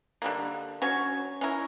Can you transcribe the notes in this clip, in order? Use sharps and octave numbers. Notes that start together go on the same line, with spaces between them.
D3 G3 A#3
F#3 C#4 F#4 C#5
C#4 E4 A#4